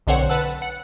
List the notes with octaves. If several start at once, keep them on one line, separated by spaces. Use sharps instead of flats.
B1 D3 C4 C#5 F#5 C#7
B4 F#5 A5 E6
F#5